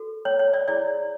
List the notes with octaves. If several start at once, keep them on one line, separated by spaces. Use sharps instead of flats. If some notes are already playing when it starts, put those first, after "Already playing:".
Already playing: F#4 A4
C#5
C#5
D5
E4 G#4 C#5 D5